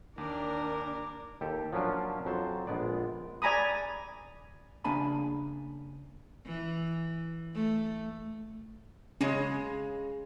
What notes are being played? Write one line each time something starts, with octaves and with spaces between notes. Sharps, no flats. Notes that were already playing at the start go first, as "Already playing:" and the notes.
D#2 D4 A#4 D6
D#2 G4 A4
F3 F#3 A#3 C#4 D4 F4
F2 F#3 C5 A5
A#1 G#3 B3 D5
D5 G#5 A#5 B5 D#6
C#3 A#3 D4 G#5 A5 B5
E3
A3
C#3 G#3 C#4 G#4